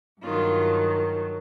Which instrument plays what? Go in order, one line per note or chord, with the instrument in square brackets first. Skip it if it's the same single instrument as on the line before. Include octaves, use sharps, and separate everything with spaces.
[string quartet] G2 D#3 F#3 F4